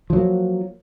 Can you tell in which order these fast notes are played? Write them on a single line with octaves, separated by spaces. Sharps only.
F3 F#3 A#3